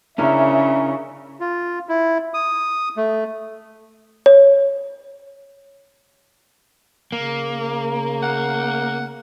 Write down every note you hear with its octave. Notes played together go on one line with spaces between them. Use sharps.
C#3 C#4 D4 E4 G#4 A#4 E5
F4
E4
D#6
A3
C#5
C#3 A#3
F#5